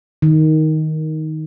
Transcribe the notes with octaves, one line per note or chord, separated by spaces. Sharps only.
D#3